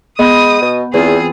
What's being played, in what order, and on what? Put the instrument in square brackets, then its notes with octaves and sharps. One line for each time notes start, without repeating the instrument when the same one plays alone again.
[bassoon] G#3 [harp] B3 B5 G6 [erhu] D#6
[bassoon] B2
[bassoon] E2 [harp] E3 C4 F4 [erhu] G#4